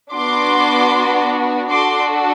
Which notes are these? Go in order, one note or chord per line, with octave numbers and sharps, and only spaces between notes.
B3 D4 F#4 C6 D6
D4 F#4 A4 C6 D6